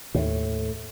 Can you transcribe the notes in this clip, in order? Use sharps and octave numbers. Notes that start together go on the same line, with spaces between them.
D#2 A2